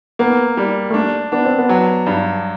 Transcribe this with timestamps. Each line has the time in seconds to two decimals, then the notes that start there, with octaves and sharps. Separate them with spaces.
0.19 A#3 B3
0.57 G3
0.90 A3
0.94 A#3 D4
1.32 B3 D4
1.45 C4
1.58 B3
1.69 F#3
2.07 G2